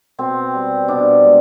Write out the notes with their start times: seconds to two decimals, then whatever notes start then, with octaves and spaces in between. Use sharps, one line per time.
0.18 B2 C4
0.54 G3
0.88 B2 D4
1.24 G#3